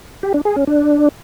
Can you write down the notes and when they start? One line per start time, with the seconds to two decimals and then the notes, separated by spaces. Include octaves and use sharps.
0.23 G4
0.34 D4
0.45 G#4
0.56 C#4
0.67 D4